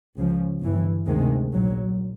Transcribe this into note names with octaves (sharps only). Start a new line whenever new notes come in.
C#2 C#3 F3
G1 G2 E3
D2 C3 D#3 G#3
A#1 A#2 F#3